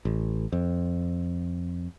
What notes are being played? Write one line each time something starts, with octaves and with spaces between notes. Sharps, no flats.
A1
F2